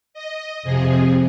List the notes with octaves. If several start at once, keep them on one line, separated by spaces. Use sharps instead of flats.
D#5
F2 C3 F3 G#4